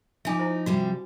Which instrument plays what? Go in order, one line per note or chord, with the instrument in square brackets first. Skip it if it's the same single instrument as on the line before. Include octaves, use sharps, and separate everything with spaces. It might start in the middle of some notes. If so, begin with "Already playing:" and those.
[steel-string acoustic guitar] F3 D#4 [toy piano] E5 G#5 D6
[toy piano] E4 C5
[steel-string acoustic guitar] C3 F3 G3 [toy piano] F#4